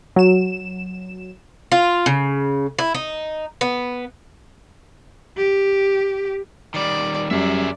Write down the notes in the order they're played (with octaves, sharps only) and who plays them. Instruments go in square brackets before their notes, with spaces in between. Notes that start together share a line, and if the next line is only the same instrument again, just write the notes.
[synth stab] F#3 E7
[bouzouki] F4
C#3
E4
D#4
B3
[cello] G4
[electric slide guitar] D#3 G3 [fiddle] D5
[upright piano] F#2 [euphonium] G3 [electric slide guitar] G4 G#4 E5 [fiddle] D5